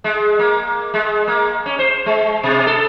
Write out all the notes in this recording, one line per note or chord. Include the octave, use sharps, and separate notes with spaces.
G#3
A#3
G#3
A#3
C#4
C5
G#3
B2
A4